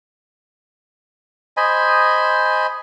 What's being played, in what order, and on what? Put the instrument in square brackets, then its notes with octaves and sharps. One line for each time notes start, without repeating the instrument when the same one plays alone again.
[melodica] C5 D#5 G#5 B5